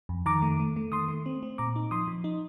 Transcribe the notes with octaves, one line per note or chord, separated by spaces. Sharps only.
F2
D#3 A#5 D6
A3
A3
A3
D#3 C6 D#6
A3
C4
C4
A#2 A#5 D6
D#4
F3 C6 D#6
F3
D#4